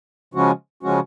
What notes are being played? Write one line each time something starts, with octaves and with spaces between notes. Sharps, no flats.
C#3 F3 G#3 C#4 F#4
C#3 F3 G#3 C#4 F#4